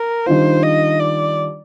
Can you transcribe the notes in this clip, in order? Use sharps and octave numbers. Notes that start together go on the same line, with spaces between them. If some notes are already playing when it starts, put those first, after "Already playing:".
Already playing: A#4
D#3 G3 D4 F4 C5
D#5
D5